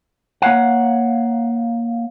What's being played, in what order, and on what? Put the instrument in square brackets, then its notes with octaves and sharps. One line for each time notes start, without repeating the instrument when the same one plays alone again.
[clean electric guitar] A#3 C#5 F5 F#5